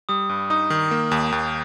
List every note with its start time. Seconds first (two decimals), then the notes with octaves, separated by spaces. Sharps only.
0.09 G3 D#6
0.29 G2
0.50 D#4 D#6
0.70 D#3
0.91 A#3
1.11 D#2
1.32 D#2